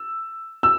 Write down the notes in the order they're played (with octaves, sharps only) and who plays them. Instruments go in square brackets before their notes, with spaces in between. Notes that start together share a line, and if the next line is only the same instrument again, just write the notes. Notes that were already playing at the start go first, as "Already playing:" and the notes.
Already playing: [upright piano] E6
E6